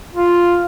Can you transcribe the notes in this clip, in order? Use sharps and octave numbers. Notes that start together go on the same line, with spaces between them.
F4